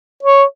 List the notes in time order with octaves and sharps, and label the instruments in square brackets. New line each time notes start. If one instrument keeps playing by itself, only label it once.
[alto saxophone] C#5